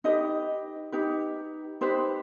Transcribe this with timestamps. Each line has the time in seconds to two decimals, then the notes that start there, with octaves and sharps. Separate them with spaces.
0.04 D#4 G4 B4 D#5
0.92 D#4 G4 B4
1.81 D#4 G4 B4 C5